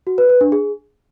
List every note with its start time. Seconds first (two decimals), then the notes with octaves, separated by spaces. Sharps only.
0.07 F#4
0.18 B4
0.29 B4
0.41 D4
0.52 G#4